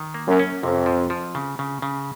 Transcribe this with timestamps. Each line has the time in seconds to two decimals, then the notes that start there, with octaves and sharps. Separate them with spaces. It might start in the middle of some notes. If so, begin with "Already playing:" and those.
Already playing: D#3
0.14 A#3
0.27 F#2
0.39 C#4
0.63 F2 C3
0.86 F3
1.10 F3
1.35 C#3
1.59 C#3
1.82 C#3